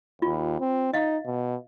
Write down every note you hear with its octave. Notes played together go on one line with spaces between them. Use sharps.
D#2 F4
C4
D#4 D#5 F5
B2